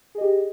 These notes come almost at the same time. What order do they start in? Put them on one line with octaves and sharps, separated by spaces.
G#4 D#5 G4